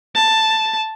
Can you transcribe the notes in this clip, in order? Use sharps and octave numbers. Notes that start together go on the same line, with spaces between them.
A5